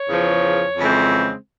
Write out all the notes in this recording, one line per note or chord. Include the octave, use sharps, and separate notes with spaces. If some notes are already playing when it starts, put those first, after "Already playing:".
Already playing: C#5
E2 C#3 F3
F2 C#3 E3 G#3 C4